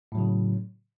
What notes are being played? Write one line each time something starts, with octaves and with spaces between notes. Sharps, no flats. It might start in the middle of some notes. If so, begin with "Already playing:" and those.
A2 C#3 F#3